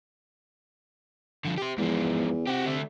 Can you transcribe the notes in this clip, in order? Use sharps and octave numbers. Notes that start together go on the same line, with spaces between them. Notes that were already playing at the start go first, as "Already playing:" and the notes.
D3 F3
G4 C5
E2 G#2 F3
C3 F#4 G4
D3 A3